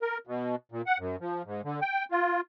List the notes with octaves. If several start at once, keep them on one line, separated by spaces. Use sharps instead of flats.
A#4
B2
A#2
F#5
F#2
F3
G#2
D3
G5
F4